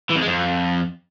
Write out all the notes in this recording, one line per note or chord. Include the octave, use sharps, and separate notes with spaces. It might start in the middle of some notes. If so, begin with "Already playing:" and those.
E3
F2
G#3
F2